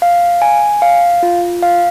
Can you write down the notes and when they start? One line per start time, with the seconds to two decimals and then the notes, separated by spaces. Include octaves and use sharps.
0.02 F5
0.42 G#5
0.82 F5
1.23 F4
1.62 F5